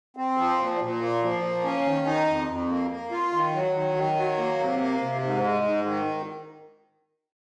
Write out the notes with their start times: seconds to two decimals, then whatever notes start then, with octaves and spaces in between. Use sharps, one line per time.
0.17 C4
0.37 F3
0.59 A#2
0.81 A#2
1.01 A#3
1.23 F3
1.43 A#3
1.64 C#4
1.86 D#3
2.06 D#4
2.27 F2
2.49 F2
2.70 A#3
2.91 A#3
3.12 F4
3.33 D#3
3.54 F#3
3.74 D#3
3.96 D#3
4.17 F#3
4.38 A#3
4.59 C3
4.80 A#3
5.02 C3
5.23 G#2
5.43 G#3
5.64 G#2
5.85 D#3